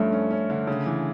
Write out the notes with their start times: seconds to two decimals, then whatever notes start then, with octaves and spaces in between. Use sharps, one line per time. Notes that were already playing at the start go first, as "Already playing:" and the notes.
Already playing: G2 F3 A3 C#4
0.12 C#4
0.31 C#4
0.50 D3
0.67 C#3
0.86 E3